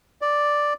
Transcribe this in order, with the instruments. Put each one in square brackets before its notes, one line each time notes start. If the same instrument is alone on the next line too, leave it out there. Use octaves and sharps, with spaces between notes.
[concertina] D5